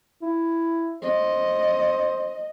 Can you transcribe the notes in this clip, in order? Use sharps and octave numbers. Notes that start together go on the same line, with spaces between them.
E4
C5 D#5